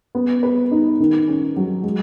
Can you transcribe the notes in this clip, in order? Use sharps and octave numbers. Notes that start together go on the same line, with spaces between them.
B3
B4
D#4
D#3
C#4
F#3
G#3